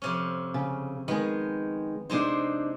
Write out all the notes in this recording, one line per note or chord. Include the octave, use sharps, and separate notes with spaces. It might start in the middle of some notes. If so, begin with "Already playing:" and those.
F2 C3 C#4
C#3
D#3 G#3 B3
C3 G#3 D4 D#4 C5